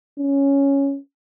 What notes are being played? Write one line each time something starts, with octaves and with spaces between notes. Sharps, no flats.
C#4